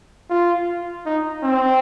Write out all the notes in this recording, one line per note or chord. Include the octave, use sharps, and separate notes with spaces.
F4
D#4
C4